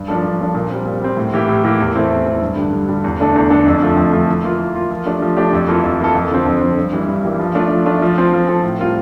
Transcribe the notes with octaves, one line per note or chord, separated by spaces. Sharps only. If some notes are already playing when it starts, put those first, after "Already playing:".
Already playing: G2
F3 A#3 D4 A4
G2
F3 A#3 D4 A4
A#2
G3 C4
A#2
G3 C4
A2
E3 A#3 E4 G4
A2
E3 A#3 E4 G4
E2
E3 A3 C4 E4
E2
E3 A3 C4 E4
G2
D3 G3
G2
D3 G3
E2
D3 A3 D4 A4
E2
D3 A3 D4 A4
F2
D3 F3 A3
F2
D3 F3 A3
E3
A#3 F4
E3
A#3 F4
F3
A3 D4 G4
F3
A3 D4 G4
F2
E3 A#3 F4 A4
F2
E3 A#3 F4 A4
F2
D3 F3 C4
F2
D3 F3 C4
G2
E3 G3 A#3
G2
E3 G3 A#3
F3
A3 D4 F4
F3
A3 D4 F4
F3
C4 F4 A4
F3
C4 F4 A4
A2
G3 C4 F4 A#4